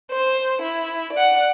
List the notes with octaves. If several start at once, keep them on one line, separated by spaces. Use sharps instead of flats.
C5
E4
D5 F#5